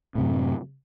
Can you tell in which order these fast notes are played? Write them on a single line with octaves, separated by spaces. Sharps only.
A2 C3 F#2